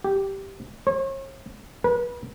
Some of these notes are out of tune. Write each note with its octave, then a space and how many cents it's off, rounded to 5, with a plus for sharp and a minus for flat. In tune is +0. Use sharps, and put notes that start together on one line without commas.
G4 -5
C#5 -40
B4 -35